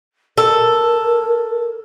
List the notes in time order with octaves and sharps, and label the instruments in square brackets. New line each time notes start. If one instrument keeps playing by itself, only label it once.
[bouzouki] A4 [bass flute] A#4